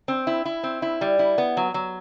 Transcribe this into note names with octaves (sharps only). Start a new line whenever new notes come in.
C4
E4
E4
C4
E4
G3
E4
B3
F#3
F#3